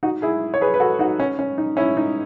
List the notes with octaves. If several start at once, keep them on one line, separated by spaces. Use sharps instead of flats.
D#4 F#4
E4 G#4
C#5
G#4 B4
B4
F#4 A4
D#4 F#4
C#4
C#4
D#4
C#4 E4
D#4